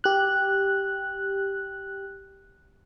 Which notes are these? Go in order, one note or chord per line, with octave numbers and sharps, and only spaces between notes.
G4 F#6